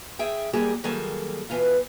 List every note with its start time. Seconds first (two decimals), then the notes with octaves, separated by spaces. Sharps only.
0.19 G#4 E5 G5
0.53 G3 A#3 G4 G#4
0.84 D#3 F#3 G3 A#3 G#4 A4
1.50 B2 E3 B3 F4